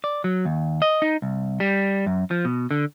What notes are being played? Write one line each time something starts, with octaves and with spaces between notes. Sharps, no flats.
D5
F#3
D#2
D#5
D#4
C2
G3
F#2
F3
B2
D3